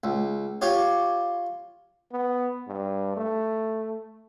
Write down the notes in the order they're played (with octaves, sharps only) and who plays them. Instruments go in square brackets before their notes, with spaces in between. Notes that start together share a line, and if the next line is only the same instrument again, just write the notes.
[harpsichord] C#2
F4 G4 C#5
[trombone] B3
G2
A3